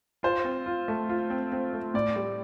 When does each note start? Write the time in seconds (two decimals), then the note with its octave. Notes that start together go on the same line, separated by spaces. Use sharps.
0.23 F4 C5
0.44 C4
0.66 F4
0.88 A3
1.09 F4
1.30 C4
1.52 C4
1.73 A3
1.94 A2 D5
2.16 G3